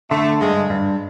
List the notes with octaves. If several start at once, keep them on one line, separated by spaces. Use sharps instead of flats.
D3 A3
G2 G#3
G2